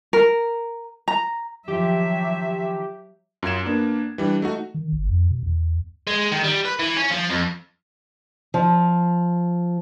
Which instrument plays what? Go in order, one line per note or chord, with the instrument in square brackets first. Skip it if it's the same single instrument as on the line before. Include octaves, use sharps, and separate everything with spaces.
[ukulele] A#4
A#5
[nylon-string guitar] D#3 F3 [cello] F#3 E5 [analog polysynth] G4
[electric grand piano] F#2 F4 G#6 E7
A#3 B3 D4
E3 G3 D4
A3 D#4 F#4
[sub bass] D#3
G1
F2
B2
E2
[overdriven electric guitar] G#3
D#3
G3
B4
E3
C#4
F3
F2
[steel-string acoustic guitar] F3